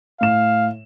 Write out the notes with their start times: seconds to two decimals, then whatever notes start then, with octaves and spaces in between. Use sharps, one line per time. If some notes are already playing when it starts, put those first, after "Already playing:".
0.21 A2 F5 E7